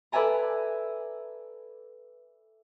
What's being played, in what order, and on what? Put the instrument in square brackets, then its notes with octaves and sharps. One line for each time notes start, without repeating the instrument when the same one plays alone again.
[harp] A4 B4 D5 E5 G#5 A#5